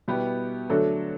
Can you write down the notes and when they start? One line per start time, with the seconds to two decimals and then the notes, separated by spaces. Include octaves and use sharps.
0.08 B2 G3 B3 E4 G4
0.70 D3 F#3 A3 D4 A4